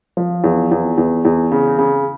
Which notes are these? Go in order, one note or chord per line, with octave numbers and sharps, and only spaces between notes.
F3
E2
E2
E2
E2
C#3
C#3